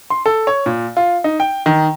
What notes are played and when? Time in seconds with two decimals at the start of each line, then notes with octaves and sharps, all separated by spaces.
0.10 C6
0.26 A4
0.47 C#5
0.66 A#2
0.97 F4
1.24 D#4
1.40 G5
1.66 D#3